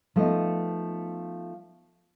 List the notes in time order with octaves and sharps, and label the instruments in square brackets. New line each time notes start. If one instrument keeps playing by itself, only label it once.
[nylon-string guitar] F3 A3 B3 D#4 D#5